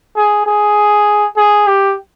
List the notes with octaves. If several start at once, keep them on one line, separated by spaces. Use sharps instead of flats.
G#4
G#4
G#4
G4